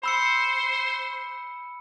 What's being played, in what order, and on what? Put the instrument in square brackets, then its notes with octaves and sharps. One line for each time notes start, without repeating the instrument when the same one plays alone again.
[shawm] C5 [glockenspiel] B5 E6 C#7